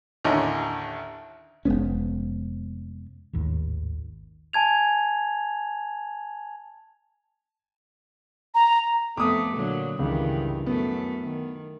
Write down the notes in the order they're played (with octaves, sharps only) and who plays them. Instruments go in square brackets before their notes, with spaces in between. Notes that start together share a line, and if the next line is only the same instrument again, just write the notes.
[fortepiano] A1 D#2 D3 C#4 D#4
[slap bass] F1 G#3 B3 C#4
[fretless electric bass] A1 D#2 G#2
[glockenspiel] G#5 A5 G#6 F7
[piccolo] A#5
[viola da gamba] F2 A3 B3 [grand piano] D6 D#6
[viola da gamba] A#2 D3 F#3
[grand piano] C#2 [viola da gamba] G2 D#3 E3
[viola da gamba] F#2 A3 [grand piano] B3
[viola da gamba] D#3